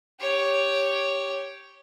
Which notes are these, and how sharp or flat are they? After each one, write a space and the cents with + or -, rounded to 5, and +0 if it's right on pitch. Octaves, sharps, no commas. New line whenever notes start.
G4 +0 C#5 +0